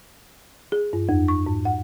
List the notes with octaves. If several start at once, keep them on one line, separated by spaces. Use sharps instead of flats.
G#4
G2
F2
C#6
G#2
F#5